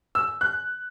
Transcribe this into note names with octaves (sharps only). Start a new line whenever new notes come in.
E6
F#6